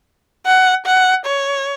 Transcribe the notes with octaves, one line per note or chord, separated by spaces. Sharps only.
F#5
F#5
C#5